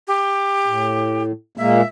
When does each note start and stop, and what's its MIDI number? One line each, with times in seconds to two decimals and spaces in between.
0.08 1.23 67
0.66 1.32 45
1.58 1.81 46
1.58 1.81 56
1.58 1.81 58
1.58 1.88 76